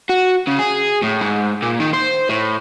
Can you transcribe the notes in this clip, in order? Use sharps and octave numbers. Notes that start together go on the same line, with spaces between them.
F#4
C#3
G#4
A2
G#2
A#2
D#3
C5
A2